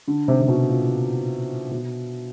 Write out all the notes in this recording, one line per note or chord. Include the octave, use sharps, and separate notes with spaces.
D3
C3
C3
B2
A#2
B2